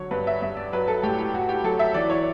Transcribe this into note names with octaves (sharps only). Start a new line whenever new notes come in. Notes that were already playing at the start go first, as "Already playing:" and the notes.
Already playing: D3 F#3 C#5
G2 B4
E5
G2 E5
D5
F#3 B4
A4
A2 G4
G4
A2 F#4
G4
F#3 A4
E5
E3 D5
C#5